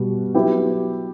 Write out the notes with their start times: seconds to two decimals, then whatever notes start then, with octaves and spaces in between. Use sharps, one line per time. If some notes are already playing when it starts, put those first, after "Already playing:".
Already playing: B2 G3 B3 F#4
0.34 F#3 B3 E4 G4